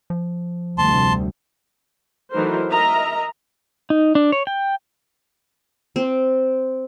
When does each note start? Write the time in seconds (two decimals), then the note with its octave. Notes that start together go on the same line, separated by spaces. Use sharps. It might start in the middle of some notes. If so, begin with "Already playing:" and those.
0.10 F3
0.78 F1 D2 G3 A5 C6
2.32 E3 F#3 A3 D#4 A#4 C5
2.71 A#4 D#5 E5 A#5
3.90 D#4
4.15 D4
4.32 C#5
4.47 G5
5.96 C4